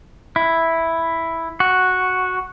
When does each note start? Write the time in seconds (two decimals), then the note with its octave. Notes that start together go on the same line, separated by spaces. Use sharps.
0.36 E4
1.60 F#4